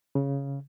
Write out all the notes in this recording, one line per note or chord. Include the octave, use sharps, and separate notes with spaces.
C#3